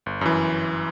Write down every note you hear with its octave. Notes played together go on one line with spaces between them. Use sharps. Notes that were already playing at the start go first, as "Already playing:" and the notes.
G1
F#2 E3